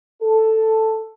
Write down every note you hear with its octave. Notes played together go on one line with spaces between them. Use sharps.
A4